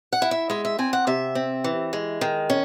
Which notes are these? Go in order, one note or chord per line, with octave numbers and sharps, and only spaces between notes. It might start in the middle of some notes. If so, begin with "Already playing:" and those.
F#5
E4
E5
G#3 E5
E5
C4 G#5
F#5
C3 E5
C4
E3
G#3
D#3
C#4